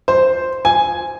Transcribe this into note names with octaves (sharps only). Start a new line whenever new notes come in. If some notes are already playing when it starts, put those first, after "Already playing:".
C5
G#5